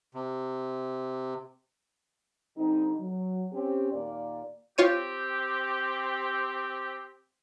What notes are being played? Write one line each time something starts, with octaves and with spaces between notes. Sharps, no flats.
C3
D3 G3 C4 D#4
F#3
C4 C#4 G4
D#2 A#2 A#3 D5
C4 F4 G4 C#5 D#7